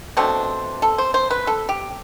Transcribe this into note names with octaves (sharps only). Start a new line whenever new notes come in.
B2 A3 C4 D4
A4
C5
C5
B4
A4
G4